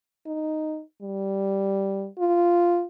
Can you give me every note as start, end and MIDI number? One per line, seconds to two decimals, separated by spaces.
0.26 0.82 63
1.02 2.08 55
2.19 2.85 65